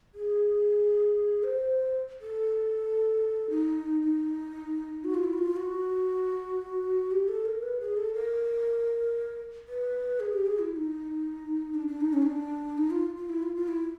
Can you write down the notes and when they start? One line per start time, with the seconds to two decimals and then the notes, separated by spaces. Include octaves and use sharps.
0.15 G#4
1.44 C5
2.21 A4
3.50 D#4
4.02 D#4
5.04 F#4
5.14 F4
5.24 E4
5.33 F#4
5.38 F4
5.56 F#4
7.11 G4
7.28 A4
7.45 A#4
7.63 B4
7.80 G#4
7.97 A4
8.14 A#4
9.68 B4
10.20 G#4
10.33 G4
10.46 G#4
10.59 E4
10.72 E4
10.76 D#4
11.75 D4
11.88 D4
12.01 D#4
12.13 C#4
12.22 D#4
12.26 D4
12.78 D#4
12.91 F4
13.17 F4
13.29 E4
13.43 F4
13.56 F4
13.68 E4